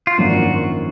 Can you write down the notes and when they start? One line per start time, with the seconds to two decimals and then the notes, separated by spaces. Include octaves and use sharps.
0.07 F4
0.18 G#1 F#2 F3 A#3 D4 F#4